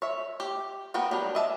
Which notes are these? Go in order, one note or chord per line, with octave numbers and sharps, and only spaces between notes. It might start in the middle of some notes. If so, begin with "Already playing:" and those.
C#5 E5
G4
A#3 B3 F#4 G5
F#3 G3 D4
D#5 E5 A5